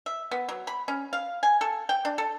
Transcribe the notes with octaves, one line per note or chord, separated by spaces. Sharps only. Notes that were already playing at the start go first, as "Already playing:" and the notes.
E5
B3
F#3
B5
C#4
F5
G#5
A4
G5
D4
A4